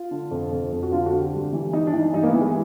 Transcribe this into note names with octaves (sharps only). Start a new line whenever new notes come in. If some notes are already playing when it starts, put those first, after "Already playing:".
Already playing: F4
D3
F2
F2
F2
F#4
D3 F4
F#4
D3
G4
G2
E3
E3 D#4
D4
E3
D#4
G2 D#4
A#3
B3
E3
G#3